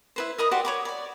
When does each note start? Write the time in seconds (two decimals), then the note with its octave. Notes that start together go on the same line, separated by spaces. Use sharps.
0.16 E4 B4 C5
0.38 A#4 D#5 B5 D#6
0.51 F#4 G4 D5 C6
0.65 C#5 B5 D6
0.85 D5 B5